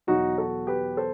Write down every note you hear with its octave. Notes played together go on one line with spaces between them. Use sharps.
E2 B2 F#3 D#4 F#4
F#4 A4
G4 B4
A4 C5